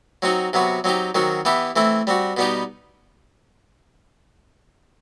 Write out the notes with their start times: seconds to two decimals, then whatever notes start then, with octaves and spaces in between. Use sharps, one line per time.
0.22 F#3 C4 D#4 F#4
0.53 C3 F#3 B3 F#4
0.84 F#3 C4 D#4 G4
1.15 D#3 F#3 C4 F#4
1.45 E3 B3 E4 G4
1.76 E3 A3 C4 E4
2.07 G3 C4 F#4
2.37 B2 G3 B3 D#4 G4